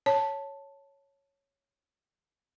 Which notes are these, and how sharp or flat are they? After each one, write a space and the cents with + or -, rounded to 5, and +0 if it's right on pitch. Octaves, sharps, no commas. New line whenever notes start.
C#5 +0 A5 +0